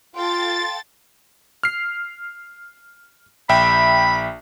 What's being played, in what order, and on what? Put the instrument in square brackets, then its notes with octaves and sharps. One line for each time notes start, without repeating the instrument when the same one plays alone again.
[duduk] F4 [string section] A4 F5 G5 [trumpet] C6 [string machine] A6
[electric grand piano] F6 C7
[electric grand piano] A#1 E5 G5 [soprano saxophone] B5